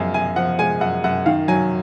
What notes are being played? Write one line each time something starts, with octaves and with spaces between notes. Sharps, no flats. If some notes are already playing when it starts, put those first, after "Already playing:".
Already playing: F#2 F3 G#3 D#5 F5 G#5
F#2 G#5
F3 F#5
G#3 G#5
F#2 F#5
F#2 F#5
D#3 F5
F#3 G#5